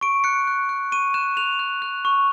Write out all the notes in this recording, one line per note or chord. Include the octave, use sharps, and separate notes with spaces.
C#6 D7
F#6 C#7
F#6
F#6
C#6 D#7
F#6 E7
F#6 F7
F#6
F#6
C#6